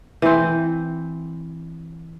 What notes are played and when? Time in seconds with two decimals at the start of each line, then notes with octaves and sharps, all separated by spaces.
0.22 E3 C4